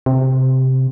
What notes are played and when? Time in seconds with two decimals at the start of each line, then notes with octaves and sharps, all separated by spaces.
0.06 C3